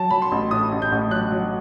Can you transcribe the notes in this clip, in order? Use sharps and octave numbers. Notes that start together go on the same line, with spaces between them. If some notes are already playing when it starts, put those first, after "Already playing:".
Already playing: F#3 A5
F#3 B5
C6
A1
A2 D#6
A1
G6
A1
F#3 F#6
F#3